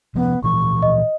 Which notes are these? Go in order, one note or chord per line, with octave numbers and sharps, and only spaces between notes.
C3 F3 B3 C#4
A#2 E3 F3 C#6
D#5